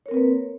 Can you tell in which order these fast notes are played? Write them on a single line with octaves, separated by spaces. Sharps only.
C#5 A#4 C4 B4 A#3